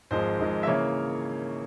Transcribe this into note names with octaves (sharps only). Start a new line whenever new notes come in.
G#1 G#2 F3 G#3 C5
G#1 G#2 F3 G#3
E5
C#3 E3 A#3 C#5